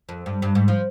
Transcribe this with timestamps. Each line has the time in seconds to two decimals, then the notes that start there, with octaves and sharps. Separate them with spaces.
0.09 F2
0.26 G2
0.42 G2
0.55 G#2
0.68 F3